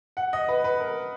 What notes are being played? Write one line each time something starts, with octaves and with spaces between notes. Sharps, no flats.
F#5
D#5
B4
B4
A#4